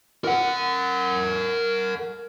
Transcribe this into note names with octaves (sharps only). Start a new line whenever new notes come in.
A#4 F#5